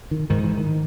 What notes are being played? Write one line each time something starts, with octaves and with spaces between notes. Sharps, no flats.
D#3
G#2 D#3
E3
D#3